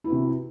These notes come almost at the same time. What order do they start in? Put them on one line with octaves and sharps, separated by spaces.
E4 B3 F#4 C3